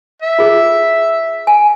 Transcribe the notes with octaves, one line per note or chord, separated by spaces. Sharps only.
E5
F4 G#4
G#5